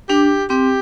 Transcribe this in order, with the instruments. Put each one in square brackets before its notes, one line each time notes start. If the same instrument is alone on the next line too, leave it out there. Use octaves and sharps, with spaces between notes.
[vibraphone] D4 [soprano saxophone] G4
[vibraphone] C4 [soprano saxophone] G4